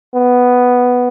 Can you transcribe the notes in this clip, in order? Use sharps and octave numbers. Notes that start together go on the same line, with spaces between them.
B3